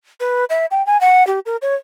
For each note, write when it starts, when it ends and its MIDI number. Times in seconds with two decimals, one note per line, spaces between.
0.20 0.45 71
0.50 0.66 76
0.71 0.85 79
0.86 1.00 80
1.01 1.26 78
1.27 1.39 67
1.46 1.57 70
1.62 1.75 73